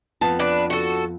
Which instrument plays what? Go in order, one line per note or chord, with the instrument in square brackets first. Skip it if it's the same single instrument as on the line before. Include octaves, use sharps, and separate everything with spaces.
[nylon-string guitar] F2 B3 A5
[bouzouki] D4 B4
F#4 A4